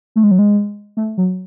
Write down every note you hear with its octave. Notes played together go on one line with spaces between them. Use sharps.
A3
G#3
F#3
G#3
A3
F#3